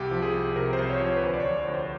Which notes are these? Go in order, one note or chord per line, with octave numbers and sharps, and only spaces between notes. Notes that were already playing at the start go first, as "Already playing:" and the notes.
Already playing: C2 G4
F3
G#4
C2
C3 A#4
C5
C2
C#5
F3
C#5
B4
D2 C5
D5
C#5
F3
C#5
D2
C5